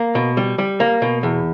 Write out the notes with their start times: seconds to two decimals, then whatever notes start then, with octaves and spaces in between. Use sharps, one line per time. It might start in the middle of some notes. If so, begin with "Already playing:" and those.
Already playing: A#3
0.15 B2
0.37 G3
0.58 G3
0.80 A#3
1.02 B2
1.23 E2